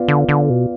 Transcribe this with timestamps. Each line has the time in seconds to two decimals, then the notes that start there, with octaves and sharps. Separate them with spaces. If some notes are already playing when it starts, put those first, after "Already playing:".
Already playing: B3 F4 B4 D5 F5
0.08 D3
0.29 D3
0.50 B2